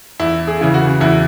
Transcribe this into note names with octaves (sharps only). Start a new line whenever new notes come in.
E2 E4
G#4
C#3 E3
F#4
E2 E4